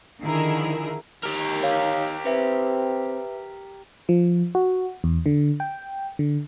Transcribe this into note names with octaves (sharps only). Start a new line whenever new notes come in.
D3 D#3 F3 E4 G#4 A#4
D#3 G4 A#4
C#5 F5
C4 B4 E5
F3
F#4
E2
D3
G5
D3